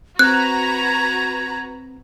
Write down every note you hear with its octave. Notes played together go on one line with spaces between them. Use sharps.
C4 F#4 B4 A#5 F#6 G#6